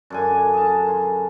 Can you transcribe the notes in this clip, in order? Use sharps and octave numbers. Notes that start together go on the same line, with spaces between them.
F#2 D3 G#5
G#4 A#4 A5
C6